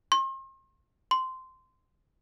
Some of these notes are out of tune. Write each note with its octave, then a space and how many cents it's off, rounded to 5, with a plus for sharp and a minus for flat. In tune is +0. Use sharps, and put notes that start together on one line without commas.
C6 +40
C6 -10